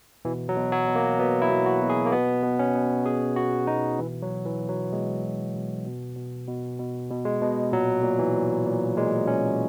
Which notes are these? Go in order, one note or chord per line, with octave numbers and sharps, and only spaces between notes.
B2 E3
F#3
B2
F#3
B2
A#3
B2 B3
E4
B2
F#4
B2
G#4
A#3
B2 B3
B2
C#4
B2
B2 G#4
B2 F#4
B2 D#4
B2 E3
F#3
B2
E3
B2
F#3
B2 G#3
B2
B2
B2
B2
B2
B2
B2
G#3
B2
A#2 F#3
A#2
E3
A#2
A#2
A#2 G#3
A#2 C#4